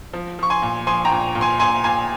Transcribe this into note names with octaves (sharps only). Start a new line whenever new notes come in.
F3
F3 C#6
G#5 C6
A#2
F3 G#5 C6
G5 A#5
A#2
A#2
G#5 C6
A#2 G#5 C6
A#2 G#5 C6